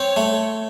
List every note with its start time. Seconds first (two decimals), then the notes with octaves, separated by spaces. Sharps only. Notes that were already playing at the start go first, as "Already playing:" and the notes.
Already playing: C4 C#5
0.16 A3